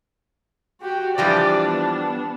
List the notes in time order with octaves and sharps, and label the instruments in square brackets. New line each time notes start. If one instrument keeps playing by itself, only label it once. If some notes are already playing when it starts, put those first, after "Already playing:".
[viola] F#4 [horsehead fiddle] G4 G5
[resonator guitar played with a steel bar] E3 F3 G3 [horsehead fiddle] D4 [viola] D5
[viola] B3